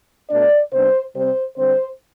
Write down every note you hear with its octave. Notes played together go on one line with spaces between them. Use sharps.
B2 A3 D4 D5
C3 G3 B3 D4 C5
C3 G3 C4 C5
D3 G3 C4 C5